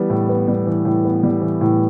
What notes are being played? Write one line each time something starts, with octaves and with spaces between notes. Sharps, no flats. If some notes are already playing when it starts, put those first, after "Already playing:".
Already playing: E3 G3 B3
A2
B3
G3
E3
A2
B3
G3
E3
A2